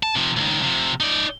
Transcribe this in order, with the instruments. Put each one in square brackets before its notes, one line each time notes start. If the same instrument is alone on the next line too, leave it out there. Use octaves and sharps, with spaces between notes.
[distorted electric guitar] A5
C3 F3
C#2 D#3
C3 F3
D#4 D5